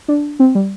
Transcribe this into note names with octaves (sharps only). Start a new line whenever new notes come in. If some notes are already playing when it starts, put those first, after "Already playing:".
D4
C4
G3